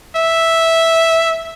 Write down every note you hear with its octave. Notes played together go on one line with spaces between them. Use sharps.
E5